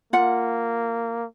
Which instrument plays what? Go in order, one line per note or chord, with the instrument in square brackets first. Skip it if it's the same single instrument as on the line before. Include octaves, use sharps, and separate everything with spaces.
[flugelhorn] A#3 [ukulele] F4 F#5